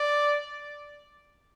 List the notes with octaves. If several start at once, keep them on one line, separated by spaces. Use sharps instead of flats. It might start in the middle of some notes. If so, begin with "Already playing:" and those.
Already playing: D5